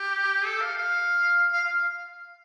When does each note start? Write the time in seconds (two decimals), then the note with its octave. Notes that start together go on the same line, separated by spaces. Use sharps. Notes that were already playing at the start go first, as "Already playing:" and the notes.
Already playing: G4
0.46 A4
0.61 F5
0.78 F5
1.53 F5
1.64 F5